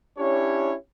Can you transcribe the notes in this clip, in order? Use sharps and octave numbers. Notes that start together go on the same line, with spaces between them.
C#4 D4 E4 G4 C#5